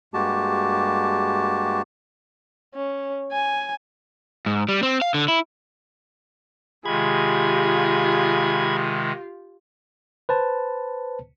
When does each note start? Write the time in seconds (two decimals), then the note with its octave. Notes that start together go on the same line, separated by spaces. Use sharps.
0.14 G2 G#3 A#3 F#4 G4 A5
2.75 C#4
3.32 G#5
4.46 G#2
4.69 G3
4.83 C4
5.02 F5
5.14 D3
5.28 E4
6.86 C3 D#3 G#3 F4 G4 G#4 B5 G#6
10.29 B4 C5 A5